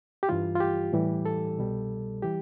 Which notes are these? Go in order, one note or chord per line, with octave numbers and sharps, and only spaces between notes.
G4
G2 E3 G3 F4
F4
G4
A2 E3 G3
A4
C2 B2 G3
E3 G3 G4